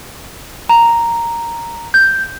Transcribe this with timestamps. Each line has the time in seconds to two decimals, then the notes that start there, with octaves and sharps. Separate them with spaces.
0.69 A#5
1.94 G6